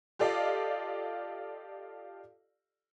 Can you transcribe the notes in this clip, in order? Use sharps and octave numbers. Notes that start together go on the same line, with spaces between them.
F4 G4 A4 D5 D#5 F5